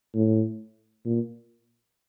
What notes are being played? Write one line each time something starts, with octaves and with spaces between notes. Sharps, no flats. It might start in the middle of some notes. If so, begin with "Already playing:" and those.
A2
A#2